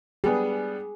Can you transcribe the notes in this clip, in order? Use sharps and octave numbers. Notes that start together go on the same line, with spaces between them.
G3 B3 D4 G#4